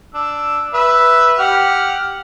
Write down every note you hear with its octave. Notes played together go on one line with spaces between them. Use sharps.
D4 E6
B4 E5 E6
G4 F#5 F6